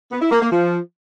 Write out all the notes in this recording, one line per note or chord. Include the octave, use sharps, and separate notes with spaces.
B3
E4
A#3
A#3
F3